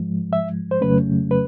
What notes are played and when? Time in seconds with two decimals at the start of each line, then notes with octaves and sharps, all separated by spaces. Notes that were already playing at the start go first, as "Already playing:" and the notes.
Already playing: G#2 F3 G#3
0.33 E5
0.71 C5
0.81 F2 C#3 F#3 A3 C#4 B4
1.31 B4